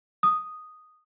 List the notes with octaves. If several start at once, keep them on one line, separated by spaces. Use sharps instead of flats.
D#6